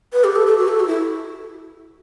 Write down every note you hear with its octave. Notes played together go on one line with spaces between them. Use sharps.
B4
G4
A4
A4
F#4
A4
F#4
E4